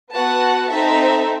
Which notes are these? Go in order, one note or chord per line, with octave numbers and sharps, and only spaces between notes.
B3 F#4 B4 F#5 A5
C4 D#4 A4 E5